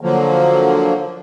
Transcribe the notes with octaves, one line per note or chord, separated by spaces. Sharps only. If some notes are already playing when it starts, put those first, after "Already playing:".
D3 F3 F#3 A#3